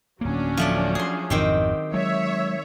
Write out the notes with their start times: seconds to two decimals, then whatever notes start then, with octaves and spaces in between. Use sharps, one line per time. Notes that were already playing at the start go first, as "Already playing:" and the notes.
0.21 D1 F#3 A#3 C#4 D4
0.57 F3 A3 D5
0.95 G#4 C6
1.30 G#1 F2 D#3 F#3 C4 G4
1.94 F#3 G#3 C#5 E5